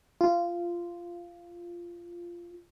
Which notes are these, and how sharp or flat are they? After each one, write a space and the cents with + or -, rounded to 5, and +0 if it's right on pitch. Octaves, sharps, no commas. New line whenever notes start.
F4 -15